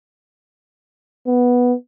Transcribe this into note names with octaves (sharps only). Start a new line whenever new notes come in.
B3